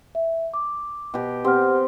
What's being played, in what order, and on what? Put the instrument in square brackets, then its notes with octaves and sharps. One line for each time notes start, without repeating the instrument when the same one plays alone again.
[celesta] E5
D6
[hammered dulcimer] B2 G4
[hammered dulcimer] C4 [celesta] G4 F#5 F6